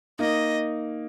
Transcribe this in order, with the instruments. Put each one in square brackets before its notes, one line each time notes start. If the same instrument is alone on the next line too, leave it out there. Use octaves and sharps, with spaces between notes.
[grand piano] A#3 D#4 [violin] D#5